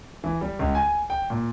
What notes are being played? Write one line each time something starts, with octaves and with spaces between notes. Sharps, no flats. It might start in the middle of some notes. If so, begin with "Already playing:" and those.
E3
G3
C#2
G#5
G5
A#2